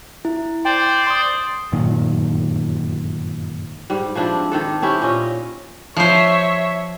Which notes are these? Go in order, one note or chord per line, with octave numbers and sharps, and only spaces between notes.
E4
C5 D5 G5
C6 D#6
G1 F#2 A#2 D#3
G#2 G3
F3 C4 D4 E4
D#3 D4 A4
C4 C#4 E4 G4
A#2 C#4 D#5
F3 C5 C#5 E5